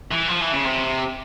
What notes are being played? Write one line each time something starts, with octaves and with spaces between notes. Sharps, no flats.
E3
F3
E3
C#3
C3